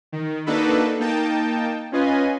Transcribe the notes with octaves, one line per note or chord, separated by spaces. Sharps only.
D#3
A#3 D4 D#4 F#4 A4 B4
A#3 D#4 G5 A5
C#4 F4 B4 D#5 G#5